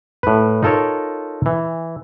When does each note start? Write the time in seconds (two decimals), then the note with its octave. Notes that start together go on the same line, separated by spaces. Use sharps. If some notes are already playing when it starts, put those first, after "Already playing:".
0.23 A2 B4
0.63 D#4 F4 A4 A#4 C#5
1.46 E3